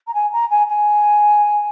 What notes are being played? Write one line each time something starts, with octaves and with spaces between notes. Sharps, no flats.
A#5
G#5
A#5
G#5
G#5